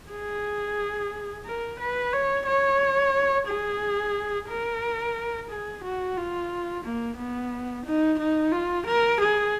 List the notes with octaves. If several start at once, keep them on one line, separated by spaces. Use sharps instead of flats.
G#4
A#4
B4
C#5
C#5
G#4
A#4
G#4
F#4
F4
A#3
B3
D#4
D#4
F4
A#4
G#4